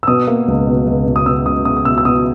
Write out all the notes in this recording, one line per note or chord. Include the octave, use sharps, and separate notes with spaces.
E6
B2 D#6
A#3
C#2
B2
C#2
B2
D#6
B2 E6
C#2 D#6
B2 D#6
D#6
B2 E6
E6
B2 D#6